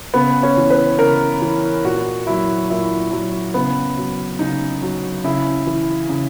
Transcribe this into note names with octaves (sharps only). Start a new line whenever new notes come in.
C#3 B3
C#4
E3
B4
C#3 A#4
E3
A#2 F#4
F#3 E4
A#2 E4
F#3
C#3 B3
F#3
C#3 D#4
F#3
C#3 E4
E3
C#3